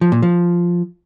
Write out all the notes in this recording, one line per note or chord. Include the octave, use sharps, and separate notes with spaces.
F3
A#2
F3